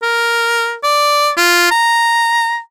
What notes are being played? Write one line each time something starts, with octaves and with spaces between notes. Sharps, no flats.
A#4
D5
F4
A#5